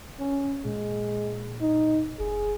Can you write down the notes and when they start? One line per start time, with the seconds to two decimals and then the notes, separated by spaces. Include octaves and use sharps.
0.20 C#4
0.65 A#2 G#3
1.61 D#4
2.19 F#1 G#4